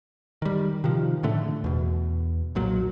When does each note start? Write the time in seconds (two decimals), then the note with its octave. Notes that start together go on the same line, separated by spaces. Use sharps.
0.42 D#3 G3
0.84 C3 D#3 F3
1.23 A2 D3 A3
1.64 E2 B2
2.55 B1 A#2 F#3